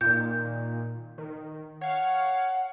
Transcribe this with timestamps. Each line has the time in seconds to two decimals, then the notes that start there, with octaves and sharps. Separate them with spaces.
0.01 A#2 D#3 G6
1.18 D#3
1.81 C#5 F5 F#5